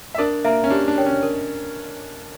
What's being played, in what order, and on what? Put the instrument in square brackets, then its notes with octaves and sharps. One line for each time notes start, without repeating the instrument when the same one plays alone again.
[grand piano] E5
[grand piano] D4 D5 [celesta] A#4
[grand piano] A#3 A#4 [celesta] E5 A#5
[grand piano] C#4
[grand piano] D4 [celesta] G4
[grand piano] D4
[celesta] A#4 C#5 G5
[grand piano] C#4
[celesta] A#4